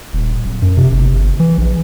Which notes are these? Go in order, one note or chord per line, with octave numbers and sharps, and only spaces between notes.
D#1
D1
F#2
C3
G1
G1
E3
A#1